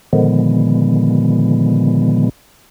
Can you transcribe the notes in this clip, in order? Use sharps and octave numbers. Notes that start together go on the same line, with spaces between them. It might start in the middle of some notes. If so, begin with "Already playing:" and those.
A#2 D3 D#3 F3 G#3 B3